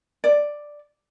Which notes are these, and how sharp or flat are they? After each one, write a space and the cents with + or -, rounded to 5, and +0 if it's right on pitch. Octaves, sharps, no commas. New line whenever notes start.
D5 +5